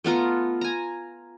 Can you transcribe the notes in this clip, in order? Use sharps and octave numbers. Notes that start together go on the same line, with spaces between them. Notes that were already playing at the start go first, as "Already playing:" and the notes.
A3 B3 F4 A#5
G#5 A#5